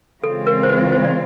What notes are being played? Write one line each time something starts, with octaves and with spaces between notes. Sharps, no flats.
C#3 E3 G#3 C4 F4 A4
A#4
C5
B4
C5
D5